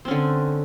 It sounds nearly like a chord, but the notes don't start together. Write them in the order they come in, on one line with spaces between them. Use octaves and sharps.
C4 C#4 D3